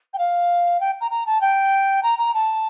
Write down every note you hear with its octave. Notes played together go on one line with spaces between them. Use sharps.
G5
F5
G5
A#5
A#5
A5
G5
A#5
A#5
A5